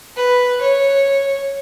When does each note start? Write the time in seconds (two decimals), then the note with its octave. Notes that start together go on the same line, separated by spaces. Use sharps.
0.17 B4
0.61 C#5